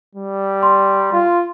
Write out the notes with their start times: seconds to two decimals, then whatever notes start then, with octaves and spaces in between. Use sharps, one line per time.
0.16 G3
0.63 C6
1.13 F4